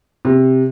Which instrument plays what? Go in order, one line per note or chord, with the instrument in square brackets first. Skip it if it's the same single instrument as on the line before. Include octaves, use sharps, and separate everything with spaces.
[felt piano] C3